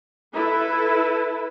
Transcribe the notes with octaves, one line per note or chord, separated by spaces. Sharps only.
E4 A4 B4